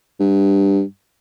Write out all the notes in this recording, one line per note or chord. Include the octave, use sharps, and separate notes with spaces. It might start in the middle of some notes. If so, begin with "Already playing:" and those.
G2